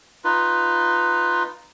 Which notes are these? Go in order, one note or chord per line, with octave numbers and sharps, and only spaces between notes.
D#4 F4 B4